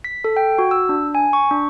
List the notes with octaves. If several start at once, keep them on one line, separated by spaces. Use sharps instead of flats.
B6
A4
G5
F#4
E6
D4
G#5
C#6
D4